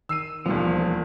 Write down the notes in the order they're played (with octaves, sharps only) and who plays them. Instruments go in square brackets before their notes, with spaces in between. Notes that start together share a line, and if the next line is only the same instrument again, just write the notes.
[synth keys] D#3 [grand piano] E6 C7 D#7
[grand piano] E1 D#2 B3 [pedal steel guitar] F3 [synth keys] G3 A3